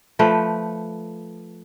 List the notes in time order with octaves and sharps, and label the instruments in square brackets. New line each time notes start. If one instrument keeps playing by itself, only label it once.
[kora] F3 A3 B4 G5